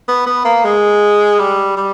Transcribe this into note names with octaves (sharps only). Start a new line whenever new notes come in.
B3
B3
A#3
G#3
G3
G3